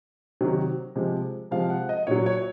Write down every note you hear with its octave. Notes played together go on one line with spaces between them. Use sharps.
C3 D#3 F#3
C3 F3 G#3
C3 F3 G#3 F5
F#5
D#5
A#2 F#3 C#5
C#5